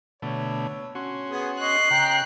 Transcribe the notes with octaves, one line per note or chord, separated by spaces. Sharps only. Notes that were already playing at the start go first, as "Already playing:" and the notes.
B2 D3 A3 C#5
C#4 F#4 C6
B3 G#4
D#5 C#6 F#6 C7
C#3 G5 A#5